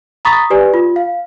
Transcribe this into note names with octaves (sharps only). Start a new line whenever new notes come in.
A#5 B5 C#6 D#6 A6 B6
G4 B4 D5 G#5
F4
F5